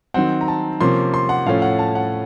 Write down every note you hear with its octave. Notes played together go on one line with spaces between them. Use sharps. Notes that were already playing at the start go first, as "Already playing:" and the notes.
D#3 F#3 C4 F#5
A#5
A5
C3 F3 A#3 C#4 C6
C6
F#5
A2 F3 A3 C#4 F5
F#5
A5
F#5